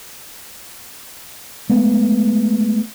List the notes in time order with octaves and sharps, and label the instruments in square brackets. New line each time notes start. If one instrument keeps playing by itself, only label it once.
[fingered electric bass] G#3 A3 B3